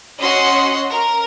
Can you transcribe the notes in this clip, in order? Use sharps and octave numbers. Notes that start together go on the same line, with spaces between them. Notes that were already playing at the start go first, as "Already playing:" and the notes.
C#4 F#4 D#5 F#5 C6
A#4